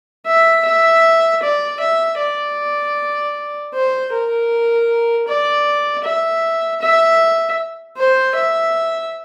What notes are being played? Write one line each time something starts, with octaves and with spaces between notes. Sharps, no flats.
E5
E5
D5
E5
D5
C5
A#4
D5
E5
E5
C5
E5